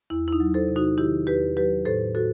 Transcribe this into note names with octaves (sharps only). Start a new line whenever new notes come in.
E2 E4
E4
D#4
F#3
A4 C5
C3
D#4 F#4
D#3 E4 G4
E2 G4 B4
F#3 G4 B4
A2 A4 C5
A2 F#4 A4